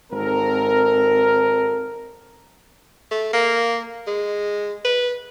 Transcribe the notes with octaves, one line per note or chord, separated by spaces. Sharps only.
G#1 G#2 C4 A4 A#4
A3
A#3
G#3
B4